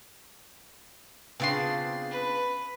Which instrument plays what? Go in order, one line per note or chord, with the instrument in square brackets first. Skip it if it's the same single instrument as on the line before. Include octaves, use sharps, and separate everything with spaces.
[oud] C#3 B3 F4 [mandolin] C4 D4 C6
[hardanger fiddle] B4